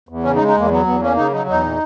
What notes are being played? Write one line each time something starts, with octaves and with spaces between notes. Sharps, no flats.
E2
C#3 C#4
D#4
G#3
D#4
E2 A#3
F#3 B3
E2 B3
A#3 C#4
C#3 D#4
F#3 D#4
E2 D#4
A#2